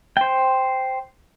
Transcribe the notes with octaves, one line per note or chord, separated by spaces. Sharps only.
C5 G5